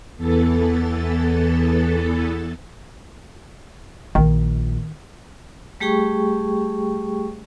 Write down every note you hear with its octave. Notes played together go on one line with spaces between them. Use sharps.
E2 E3 B3 A4 A6
A#1 D#3
G3 A3 G4 G#4 G5 C#6